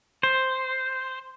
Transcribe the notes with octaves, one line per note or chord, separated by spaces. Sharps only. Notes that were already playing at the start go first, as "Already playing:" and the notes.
C5